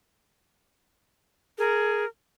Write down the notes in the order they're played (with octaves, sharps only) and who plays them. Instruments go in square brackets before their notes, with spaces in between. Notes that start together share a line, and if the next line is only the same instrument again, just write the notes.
[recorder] G#4 [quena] A#4